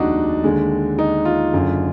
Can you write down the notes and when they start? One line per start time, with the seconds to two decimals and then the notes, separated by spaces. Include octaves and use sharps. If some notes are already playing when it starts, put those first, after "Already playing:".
Already playing: F1 D#2 D#3 G#3 D4 D#4 F#4
0.44 D#2 D3 G#3
0.99 D#4
1.25 F4
1.54 F#1 F#2 D3